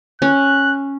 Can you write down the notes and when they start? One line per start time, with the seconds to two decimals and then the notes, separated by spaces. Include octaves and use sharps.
0.22 C#4 F#6